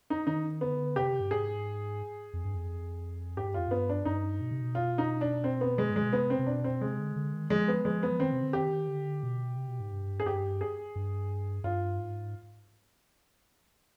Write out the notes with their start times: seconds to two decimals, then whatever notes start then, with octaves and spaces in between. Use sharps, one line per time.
0.10 D#4
0.27 D#3 D#4
0.61 D3 B3
0.96 C3 G4
1.20 G2
1.30 G#2 G#4
2.33 F2
2.45 G2
2.55 F2
3.37 G#2 G4
3.47 G2
3.54 F2 F4
3.68 G2 B3
3.89 D4
4.05 G2 D#4
4.41 B2
4.51 C3
4.61 B2
4.75 F4
4.98 D#4
5.21 D4
5.44 C4
5.61 B3
5.78 G#3
5.90 G#2
5.96 G#3
6.02 B2
6.13 C3 B3
6.30 C4
6.39 C3
6.47 B2 D4
6.64 C4
6.81 C3 G#3
6.99 D3
7.16 D3
7.33 D#3
7.50 F3 G#3
7.68 B3
7.84 F3 G#3
8.03 B3
8.11 F3
8.19 D#3 C4
8.32 C3
8.43 D3
8.53 D#3 G4
8.88 D3
9.23 B2
9.56 C3
9.68 B2
9.80 G#2
9.92 G2
10.19 G#2 G#4
10.26 G2 G4
10.61 G#4
10.95 G2
11.64 G2 F4
11.98 G#2